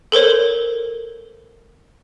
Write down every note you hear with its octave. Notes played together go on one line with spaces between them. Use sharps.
A4 A#4 C5 C#5